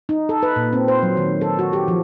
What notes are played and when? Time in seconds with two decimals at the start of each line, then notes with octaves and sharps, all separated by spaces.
0.09 D#4
0.29 A4
0.43 B4
0.56 A#2
0.73 C4
0.88 C5
1.03 F#3
1.17 D#3
1.41 A4
1.59 F#4
1.73 G4
1.88 F3